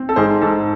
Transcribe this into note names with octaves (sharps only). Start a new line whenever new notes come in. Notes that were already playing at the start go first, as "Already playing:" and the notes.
Already playing: C4
A4
G#2 G#4 C5
G#2 A4